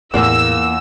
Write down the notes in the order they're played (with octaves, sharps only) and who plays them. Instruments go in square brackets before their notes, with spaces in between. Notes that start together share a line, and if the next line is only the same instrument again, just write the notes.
[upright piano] E2 [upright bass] A2 A3 [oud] A#3 F4 D5 [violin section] E6